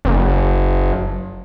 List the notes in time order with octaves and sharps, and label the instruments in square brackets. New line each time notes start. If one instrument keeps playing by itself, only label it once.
[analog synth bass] F#1